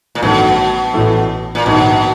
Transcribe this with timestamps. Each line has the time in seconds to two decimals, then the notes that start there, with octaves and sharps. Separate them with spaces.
0.15 A#2
0.22 A1 G2 B2 D#3 F#3 A3
0.94 A1 A2 E3 A3
1.55 A#2
1.66 A#1 G#2 B2 D#3